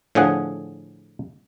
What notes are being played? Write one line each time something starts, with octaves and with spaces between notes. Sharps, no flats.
A2 D3 F3 G#4 F#5